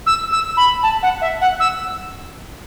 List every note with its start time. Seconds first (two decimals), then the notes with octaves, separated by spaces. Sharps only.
0.06 E6
0.32 E6
0.57 B5
0.83 A5
1.03 F#5
1.21 E5
1.41 F#5
1.60 E6